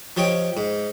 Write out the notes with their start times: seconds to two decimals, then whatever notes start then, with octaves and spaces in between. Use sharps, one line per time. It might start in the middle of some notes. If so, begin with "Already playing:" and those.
0.17 F3 G4 C#5 D#5 D6
0.57 G#2